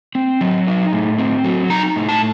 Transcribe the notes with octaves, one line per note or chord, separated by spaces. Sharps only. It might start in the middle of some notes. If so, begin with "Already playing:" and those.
C4
F#3
D#4
A2
C4
F#3
D#4 A#5
A2
A5